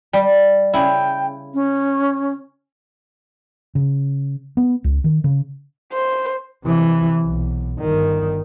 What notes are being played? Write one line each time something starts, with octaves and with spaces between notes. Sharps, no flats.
G3
C#3 E4 G5
C#4
C#3
B3
C#2
D#3
C#3
C5
C3 E3
B1
G1 D#3